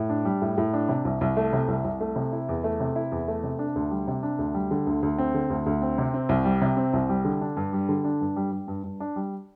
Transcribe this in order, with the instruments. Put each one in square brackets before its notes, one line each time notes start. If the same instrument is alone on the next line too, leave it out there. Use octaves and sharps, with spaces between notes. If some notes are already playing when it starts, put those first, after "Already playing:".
Already playing: [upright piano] A2
D4
G3
A2
A2
D4
C3
C2
C2
A3
C3
C2
C2
A3
C3
E4
E2
A3
C3
E4
E2
A3
C3
D4
D2
G3
C3
D4
D2
G3
D3
D2
D2
C4
D3
D2
D2
C4
C3
C4
C2
G3
C3
C4
C2
G3
D3
D4
G2
G3
D3
D4
G2
G3
G3
G2
G2
D4
G3